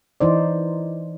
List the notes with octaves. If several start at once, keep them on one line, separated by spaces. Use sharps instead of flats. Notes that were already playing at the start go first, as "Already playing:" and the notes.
E3 D#4 C5 D5